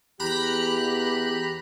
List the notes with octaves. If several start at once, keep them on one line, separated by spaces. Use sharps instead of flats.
E2 G4 A#5 B5 F#6